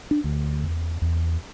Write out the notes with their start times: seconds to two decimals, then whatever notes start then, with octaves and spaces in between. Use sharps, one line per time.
0.11 D4
0.24 D2
0.63 E2
1.02 E2